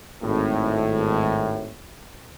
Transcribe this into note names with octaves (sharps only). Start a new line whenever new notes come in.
G#1 A2